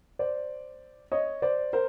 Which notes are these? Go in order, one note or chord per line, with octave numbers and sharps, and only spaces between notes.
C5 D5
C#5 D#5
C5 D5
A#4 C5